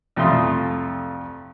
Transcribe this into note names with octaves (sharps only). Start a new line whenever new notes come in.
C2 F2 A3 F4 C6 D#6